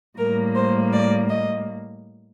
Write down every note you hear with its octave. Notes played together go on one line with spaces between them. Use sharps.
A2 G3 A#3 A#4
C5
D5
D#5